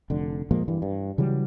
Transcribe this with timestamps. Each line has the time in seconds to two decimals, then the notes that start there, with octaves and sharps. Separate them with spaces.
0.10 F1 D3
0.51 A#2 F3 G#3 A#3
0.68 G2 E3
0.82 G2
1.18 C#3 E3 F#3 G3